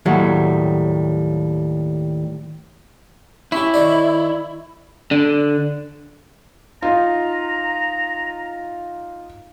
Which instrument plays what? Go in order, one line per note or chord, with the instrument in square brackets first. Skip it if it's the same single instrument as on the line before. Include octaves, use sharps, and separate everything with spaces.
[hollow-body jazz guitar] D#2 A2 F#3 G3
[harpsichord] C#4 G4 [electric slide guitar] E4
[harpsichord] D#3 C#5 D5
[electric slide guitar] D3
[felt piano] D#4 F4 [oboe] A#5